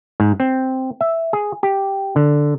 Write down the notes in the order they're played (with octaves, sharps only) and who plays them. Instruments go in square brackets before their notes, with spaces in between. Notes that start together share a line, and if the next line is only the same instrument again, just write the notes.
[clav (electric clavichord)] G#2
C4
E5
G#4
G4
D3